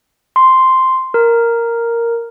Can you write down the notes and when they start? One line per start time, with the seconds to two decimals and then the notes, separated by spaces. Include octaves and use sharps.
0.36 C6
1.14 A#4